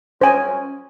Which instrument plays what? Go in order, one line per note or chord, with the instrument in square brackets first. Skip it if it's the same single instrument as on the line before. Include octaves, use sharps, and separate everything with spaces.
[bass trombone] C#4 [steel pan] C5 G#5